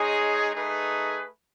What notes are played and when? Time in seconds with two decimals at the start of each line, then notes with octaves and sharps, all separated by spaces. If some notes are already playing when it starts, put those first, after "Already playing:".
Already playing: G#3 D#4 G#4 C#5
0.53 A3 D#4 G#4 B4